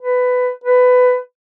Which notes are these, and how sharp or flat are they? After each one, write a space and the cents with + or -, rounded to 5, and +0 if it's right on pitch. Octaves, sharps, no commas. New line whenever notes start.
B4 +15
B4 +20